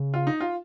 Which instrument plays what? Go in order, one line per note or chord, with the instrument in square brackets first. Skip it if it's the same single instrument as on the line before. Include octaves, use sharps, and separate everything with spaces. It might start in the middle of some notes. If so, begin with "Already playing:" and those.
Already playing: [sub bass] C#3
[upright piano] F4
D#4
F4